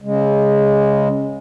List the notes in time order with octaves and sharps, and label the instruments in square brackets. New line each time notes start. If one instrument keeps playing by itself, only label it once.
[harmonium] C#3 G#3